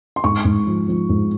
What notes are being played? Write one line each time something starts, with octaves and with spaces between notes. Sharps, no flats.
C6
G#2 C#6
G#2
F3
F3
G#2